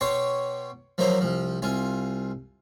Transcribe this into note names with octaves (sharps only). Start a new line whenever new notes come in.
B2 C#5 G5 C6 D6
F3 F#3 A#3 E4 C5
C2 F3
C2 F4 G#5